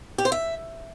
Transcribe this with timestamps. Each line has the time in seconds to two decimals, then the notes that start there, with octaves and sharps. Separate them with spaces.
0.18 G4
0.25 C5
0.32 E5